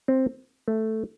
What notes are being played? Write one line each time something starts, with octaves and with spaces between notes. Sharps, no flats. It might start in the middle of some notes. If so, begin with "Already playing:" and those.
C4
A3